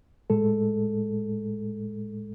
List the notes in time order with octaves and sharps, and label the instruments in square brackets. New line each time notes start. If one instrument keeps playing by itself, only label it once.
[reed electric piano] A2 G#3 A4